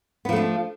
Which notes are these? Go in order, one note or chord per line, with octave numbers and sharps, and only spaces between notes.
F3 A3 B3 D4